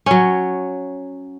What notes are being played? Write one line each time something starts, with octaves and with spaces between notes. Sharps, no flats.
F#3 C#4